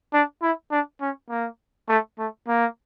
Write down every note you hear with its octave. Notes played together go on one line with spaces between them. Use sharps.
D4
E4
D4
C#4
A#3
A3
A3
A#3